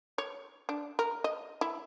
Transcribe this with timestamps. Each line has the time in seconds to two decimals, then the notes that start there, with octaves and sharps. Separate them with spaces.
0.18 C#5
0.69 D4
0.99 A#4
1.24 D#5
1.61 E4